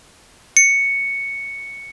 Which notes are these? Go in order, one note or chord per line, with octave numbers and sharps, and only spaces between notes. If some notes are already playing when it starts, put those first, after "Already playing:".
C#7